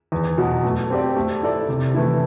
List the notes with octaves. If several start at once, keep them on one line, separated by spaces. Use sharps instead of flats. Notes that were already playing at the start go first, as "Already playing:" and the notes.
E2
B2 F#3 B3
A3
C4 G4 D5
A3
E4 A4 D5
C3
E3 A3 E4